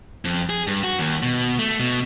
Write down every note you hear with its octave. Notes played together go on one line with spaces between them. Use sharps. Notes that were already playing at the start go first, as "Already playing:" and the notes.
F2
G#4
G2
F#4
D#2
B2
A3
B2